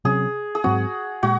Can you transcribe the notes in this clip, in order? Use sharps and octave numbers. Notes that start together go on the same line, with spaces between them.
C3 F#3 C#4 G#4
G#4
G#2 F#3 C4 F#4
A#2 G#3 F#4